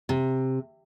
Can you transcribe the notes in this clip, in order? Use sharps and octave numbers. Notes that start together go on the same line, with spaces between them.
C3